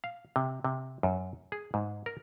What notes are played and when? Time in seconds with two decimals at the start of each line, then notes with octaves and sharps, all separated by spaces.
0.04 F5
0.36 C3
0.64 C3
1.03 F#2
1.52 G#4
1.74 G#2
2.06 A#4